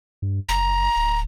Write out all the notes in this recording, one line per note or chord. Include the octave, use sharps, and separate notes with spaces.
G2
F#1 A#5
D1